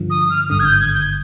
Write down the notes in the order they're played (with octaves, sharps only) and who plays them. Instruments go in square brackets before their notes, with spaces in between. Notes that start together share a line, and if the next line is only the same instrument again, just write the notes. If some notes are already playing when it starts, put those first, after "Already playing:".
Already playing: [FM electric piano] G2 D3 F3
[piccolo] D#6
F6
[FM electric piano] G#1 G2 D3 [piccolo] D#6
[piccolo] G#6
G6
G#6
G6